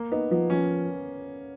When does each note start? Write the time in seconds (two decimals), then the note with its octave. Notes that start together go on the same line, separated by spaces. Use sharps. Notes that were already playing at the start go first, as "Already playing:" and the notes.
Already playing: A#3
0.12 B3 D#4
0.31 F3 B3
0.50 F3 C#4